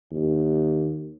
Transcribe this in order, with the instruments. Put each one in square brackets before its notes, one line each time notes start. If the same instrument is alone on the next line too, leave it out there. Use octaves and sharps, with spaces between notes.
[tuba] D#2